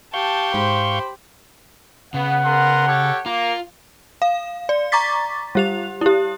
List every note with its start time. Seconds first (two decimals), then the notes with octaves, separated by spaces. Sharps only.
0.14 G4 F5 A5 C#6 G6
0.54 G#2 C5 B5
2.14 C#3 B3 F#5
2.45 B3 A#4 C6
2.88 G4 A4 C#5
3.26 A#3 F4
4.22 F5
4.69 D5
4.92 A#5 C#6 D6 A6 B6
5.55 G3 G4 F7
6.01 E4 G4